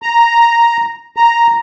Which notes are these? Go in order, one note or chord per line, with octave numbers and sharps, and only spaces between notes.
A#5
A#5